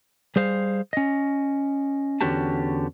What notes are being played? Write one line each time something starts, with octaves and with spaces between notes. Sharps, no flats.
G3 G#4 C5 F5
C#4 D#5
E2 D3 C#4 F#4 G4 A5